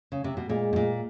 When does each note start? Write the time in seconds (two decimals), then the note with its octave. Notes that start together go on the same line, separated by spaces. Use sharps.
0.12 C#3
0.24 C3
0.37 B2
0.49 A#2 G#3
0.73 B2
0.76 A#2